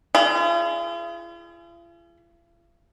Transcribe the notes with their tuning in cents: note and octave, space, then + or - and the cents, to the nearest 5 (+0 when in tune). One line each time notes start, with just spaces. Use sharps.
F4 -45 G#4 +15